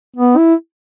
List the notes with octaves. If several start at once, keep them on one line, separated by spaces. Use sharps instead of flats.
B3
E4